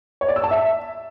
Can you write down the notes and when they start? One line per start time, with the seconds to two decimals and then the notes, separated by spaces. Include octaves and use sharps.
0.21 C#5
0.29 D5
0.36 E6
0.44 A5
0.51 E5